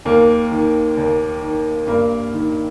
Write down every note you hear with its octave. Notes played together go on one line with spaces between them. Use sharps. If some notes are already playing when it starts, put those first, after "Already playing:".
D#2 A#3
D#3
D#2
D#3
G2 A#3
D#3